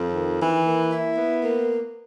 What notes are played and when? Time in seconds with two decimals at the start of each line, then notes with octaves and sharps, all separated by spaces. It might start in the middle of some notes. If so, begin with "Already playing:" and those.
Already playing: F2
0.14 D#3
0.40 E3
0.65 A#3
0.91 E4
1.17 B3
1.44 A#3